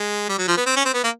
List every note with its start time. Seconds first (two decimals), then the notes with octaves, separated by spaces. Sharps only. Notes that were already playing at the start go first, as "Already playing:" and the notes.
Already playing: G#3
0.29 G3
0.38 F#3
0.47 F3
0.57 B3
0.66 C4
0.76 C#4
0.85 C4
0.94 B3
1.04 A#3